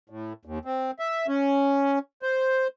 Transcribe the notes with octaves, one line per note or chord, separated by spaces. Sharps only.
A2
D#2
C4
E5
C#4
C5